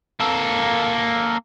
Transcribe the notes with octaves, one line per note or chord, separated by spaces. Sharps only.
A#3 A4